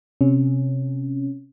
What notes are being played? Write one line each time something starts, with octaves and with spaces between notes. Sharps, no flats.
C3 C#4